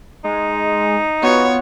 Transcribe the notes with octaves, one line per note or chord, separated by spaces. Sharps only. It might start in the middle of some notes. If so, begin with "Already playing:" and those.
G#3 D#4
B3 F4 F#4 C#5